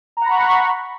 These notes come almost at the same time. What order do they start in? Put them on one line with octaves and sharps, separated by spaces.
A#5 F#5 B5 C#6